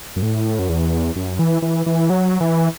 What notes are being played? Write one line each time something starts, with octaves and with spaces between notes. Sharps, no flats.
F#2
A2
F#2
E2
F#2
E3
E3
E3
F#3
E3